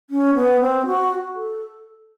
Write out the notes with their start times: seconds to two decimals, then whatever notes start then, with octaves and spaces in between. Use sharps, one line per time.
0.10 C#4
0.35 B3
0.60 C4
0.86 F#4
1.35 A4